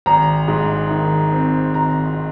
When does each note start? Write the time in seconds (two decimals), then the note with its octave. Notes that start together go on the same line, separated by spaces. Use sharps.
0.06 G#1 A#5
0.48 G#2
0.90 D#3
1.32 C4
1.74 G#1 A#5